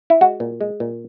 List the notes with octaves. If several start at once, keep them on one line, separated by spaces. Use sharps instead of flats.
E4
G#3 F#4
A#2
G#3
A#2